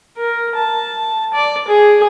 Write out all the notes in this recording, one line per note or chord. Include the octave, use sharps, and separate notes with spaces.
A#4
A5
D5
G#4